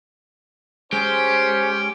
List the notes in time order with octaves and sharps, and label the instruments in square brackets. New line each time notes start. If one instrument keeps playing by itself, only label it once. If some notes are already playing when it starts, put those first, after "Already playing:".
[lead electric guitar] G#3 [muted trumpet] C#4 [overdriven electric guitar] G4 [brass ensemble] C5